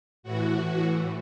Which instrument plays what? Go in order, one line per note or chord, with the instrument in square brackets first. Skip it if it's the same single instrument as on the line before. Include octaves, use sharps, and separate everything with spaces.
[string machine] A2 E3 F#4